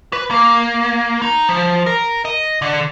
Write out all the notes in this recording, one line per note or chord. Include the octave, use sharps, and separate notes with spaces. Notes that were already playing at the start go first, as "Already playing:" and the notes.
B4
A#3
D#4
F3
A#4
D#5
D3